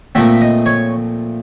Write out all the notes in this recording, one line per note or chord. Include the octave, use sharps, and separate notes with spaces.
A#2 F3 A3 C4 E5
D#5
C#5